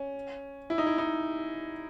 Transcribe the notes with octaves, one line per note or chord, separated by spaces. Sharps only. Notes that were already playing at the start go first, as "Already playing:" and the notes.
Already playing: C#4
E4
D#4
E4
D#4